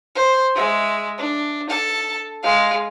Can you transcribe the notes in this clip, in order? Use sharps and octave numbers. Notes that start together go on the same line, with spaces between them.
C5
G#3 E5
D4
A4 A5
G#3 F5